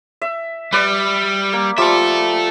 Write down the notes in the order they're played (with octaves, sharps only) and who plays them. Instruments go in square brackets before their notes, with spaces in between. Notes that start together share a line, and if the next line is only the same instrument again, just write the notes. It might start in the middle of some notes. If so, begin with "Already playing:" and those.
[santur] E5
[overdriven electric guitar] G3 [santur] B4 D5
[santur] A#3
[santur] F3 G3 D6 [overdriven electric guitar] A4 E5